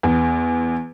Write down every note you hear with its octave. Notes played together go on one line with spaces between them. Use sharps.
E2